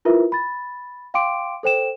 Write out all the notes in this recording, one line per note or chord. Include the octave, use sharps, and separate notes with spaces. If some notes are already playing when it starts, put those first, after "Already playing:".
E4 F4 A#4 B4 E5
B5 A6
F5 G5 C6 D6 D7
A4 C5 G5 E7